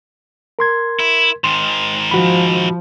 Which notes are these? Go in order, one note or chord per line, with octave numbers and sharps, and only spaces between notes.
A#4 C6 G#6
E4
G#2 D#3 C6
F3 F#4 B5